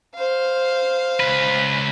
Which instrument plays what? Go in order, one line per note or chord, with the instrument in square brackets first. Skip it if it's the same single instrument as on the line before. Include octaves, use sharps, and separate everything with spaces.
[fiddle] C5 F5
[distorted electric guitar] C#2 B4